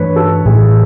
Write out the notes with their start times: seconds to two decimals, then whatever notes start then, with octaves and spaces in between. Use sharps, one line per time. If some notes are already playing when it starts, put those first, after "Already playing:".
Already playing: G2 E3 A3 D4 B4 C#5
0.16 A4
0.45 A2 E3 A3 G#4